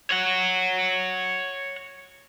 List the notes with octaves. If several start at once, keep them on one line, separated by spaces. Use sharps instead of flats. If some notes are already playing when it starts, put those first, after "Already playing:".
C#5 F#5